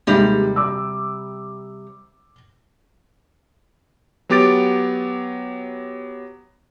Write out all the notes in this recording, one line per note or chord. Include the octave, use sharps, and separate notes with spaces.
D#2 C3 G3 G#3
D6 E6
F#3 B3 G4 D6 A6 D7